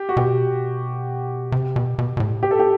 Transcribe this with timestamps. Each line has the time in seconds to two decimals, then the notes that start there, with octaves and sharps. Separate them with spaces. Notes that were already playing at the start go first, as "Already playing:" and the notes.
Already playing: G4
0.09 F#4
0.17 B2 G4
1.52 C3
1.76 B2
1.99 B2
2.17 B2
2.20 A2
2.43 G4
2.51 A4
2.59 G4